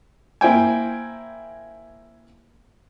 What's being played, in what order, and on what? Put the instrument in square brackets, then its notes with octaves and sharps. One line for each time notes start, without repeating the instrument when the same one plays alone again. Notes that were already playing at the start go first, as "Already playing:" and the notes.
[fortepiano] A#3 E4 C5 G5 G#5